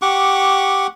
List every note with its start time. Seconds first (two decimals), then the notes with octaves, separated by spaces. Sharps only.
0.02 G4 F#5 C#6 D6